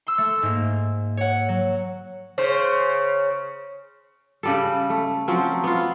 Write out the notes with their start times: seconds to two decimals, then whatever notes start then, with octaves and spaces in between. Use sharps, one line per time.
0.07 C6 E6
0.18 A3
0.43 G#2 A#3
1.17 C#5 F#5
1.49 F#3
2.38 C#3 C5
4.43 C#3 G3 A4
4.90 A3
5.28 F3 F#3 C4 C#4
5.64 B3 F4